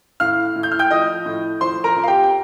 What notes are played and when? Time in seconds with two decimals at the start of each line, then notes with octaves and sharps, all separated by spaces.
0.20 A2 F5 F6
0.55 A2
0.63 G6
0.72 F6
0.79 G5 G6
0.91 F3 D#5 D#6
1.26 A2
1.61 F3 C5 C6
1.84 A#4 A#5
1.96 F2
2.04 F5
2.08 G4 G5
2.23 G5